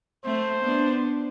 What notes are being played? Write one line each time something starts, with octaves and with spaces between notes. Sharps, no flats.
A3 C4 C5
B3 D4